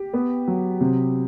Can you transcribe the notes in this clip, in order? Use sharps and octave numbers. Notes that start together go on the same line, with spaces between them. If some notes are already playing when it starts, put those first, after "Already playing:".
Already playing: G4
B3
F#3
C3